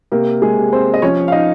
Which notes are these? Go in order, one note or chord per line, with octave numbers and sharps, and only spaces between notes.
C3 A#3 A#4
G#3 G#4
C3
C4 C5
D#5
F3 C#4 C#5
F5
D#4 D#5